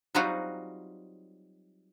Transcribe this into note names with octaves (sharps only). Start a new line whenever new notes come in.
F#3 G3 C4 D#4 F4 F#4